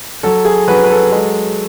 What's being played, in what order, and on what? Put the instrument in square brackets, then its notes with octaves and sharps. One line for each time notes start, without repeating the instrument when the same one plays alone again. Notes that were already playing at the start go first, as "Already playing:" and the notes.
[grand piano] F#3 A4
G#4
F#3 B4
B4
A4
G#3